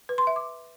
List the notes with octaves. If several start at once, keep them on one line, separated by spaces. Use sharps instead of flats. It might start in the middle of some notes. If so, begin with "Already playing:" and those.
B4
C6
E5
D6